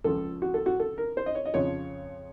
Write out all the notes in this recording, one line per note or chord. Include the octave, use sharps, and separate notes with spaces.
C#2 C#3 F3 A4
F#4
A4
F#4
A4
A#4
C5
D#5
C#5
D#5
F2 C#3 F3 C#5